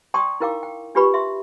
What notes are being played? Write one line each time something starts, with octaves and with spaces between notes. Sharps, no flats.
D5 G5 A5 C6 C#6 D#6
D#4 E4 A#4 F5 G5 D6
G5
D4 F4 G4 B4 B5 C#6
E5 C6